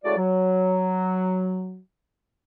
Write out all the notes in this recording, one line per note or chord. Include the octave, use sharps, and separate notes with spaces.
A2 C#3 G#3 F#4 D5
F#3